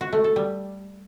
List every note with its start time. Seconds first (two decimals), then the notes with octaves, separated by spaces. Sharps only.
0.01 F#4
0.13 A3
0.24 A4
0.36 G3